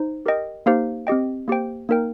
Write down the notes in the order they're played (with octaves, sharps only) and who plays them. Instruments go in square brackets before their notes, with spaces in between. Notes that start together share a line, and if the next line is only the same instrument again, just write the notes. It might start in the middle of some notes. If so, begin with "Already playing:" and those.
Already playing: [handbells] D#4 C5
G4 A#4 D#5 G5
A#3 D#4 G4 C5 F5
C4 G4 D#5 G5
A#3 G4 C5 G5
A#3 D#4 A#4 G5